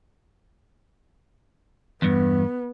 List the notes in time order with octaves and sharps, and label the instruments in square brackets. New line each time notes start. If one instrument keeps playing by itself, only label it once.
[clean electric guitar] E2 G2 [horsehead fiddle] B3